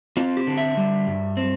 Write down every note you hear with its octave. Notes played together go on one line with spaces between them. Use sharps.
C4 F4
G4
D3
E5
G3
G2
C4